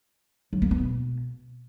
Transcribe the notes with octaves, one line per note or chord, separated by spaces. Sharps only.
F#3
A#3
B3
B2